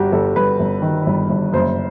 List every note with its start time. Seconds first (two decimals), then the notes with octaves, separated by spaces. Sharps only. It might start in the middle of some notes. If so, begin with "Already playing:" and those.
Already playing: G1 G2 F#4 G4
0.12 G1 A4
0.36 G1 B4
0.60 G1
0.82 D#3
1.06 G1
1.29 G1
1.53 F#1 C5